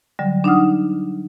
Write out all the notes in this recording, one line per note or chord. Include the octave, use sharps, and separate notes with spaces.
D3 F#3 G3
D4 D#4 F#5 D#6 F6